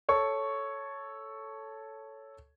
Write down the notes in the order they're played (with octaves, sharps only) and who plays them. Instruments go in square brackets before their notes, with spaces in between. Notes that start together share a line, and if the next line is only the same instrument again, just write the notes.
[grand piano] A4 C#5 C#6